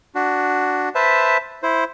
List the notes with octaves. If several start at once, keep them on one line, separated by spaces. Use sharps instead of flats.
D4 F#4
B4 C5 E5 A5
E4 C5